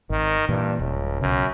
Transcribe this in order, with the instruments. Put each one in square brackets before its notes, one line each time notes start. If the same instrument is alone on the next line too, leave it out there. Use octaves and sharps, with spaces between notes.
[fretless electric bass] G#1 [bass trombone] D#3
[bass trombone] G2 [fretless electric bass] A#2 E3
[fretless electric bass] D#1 [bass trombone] C#2
[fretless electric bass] B1 C#3 [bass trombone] F#2